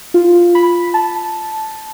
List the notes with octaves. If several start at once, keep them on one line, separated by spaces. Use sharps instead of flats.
F4
B5
A5